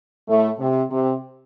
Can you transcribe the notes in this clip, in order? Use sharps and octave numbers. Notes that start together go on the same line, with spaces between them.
A2 A3
C3
C3